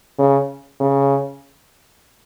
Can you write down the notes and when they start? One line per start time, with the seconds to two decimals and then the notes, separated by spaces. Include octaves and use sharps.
0.18 C#3
0.80 C#3